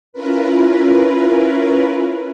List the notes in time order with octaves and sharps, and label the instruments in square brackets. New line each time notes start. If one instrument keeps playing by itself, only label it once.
[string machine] C#4 E4 F4 A#4 B4